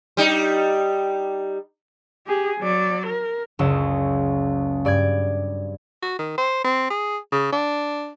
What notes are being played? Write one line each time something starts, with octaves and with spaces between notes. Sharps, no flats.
G3 D#4
G4 G#4
F#3 D5
A#4
F#1 C#2 E6
G2 D5 D6 G#6
F#4
D#3
C5
C4
G#4
C#3
D4